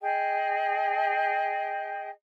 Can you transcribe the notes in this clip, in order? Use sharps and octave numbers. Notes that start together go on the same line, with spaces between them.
G#4 D#5 G5